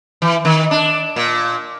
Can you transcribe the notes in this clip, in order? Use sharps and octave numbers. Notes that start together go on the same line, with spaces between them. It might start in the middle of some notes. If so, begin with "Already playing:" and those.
E3
D#3
D4
A#2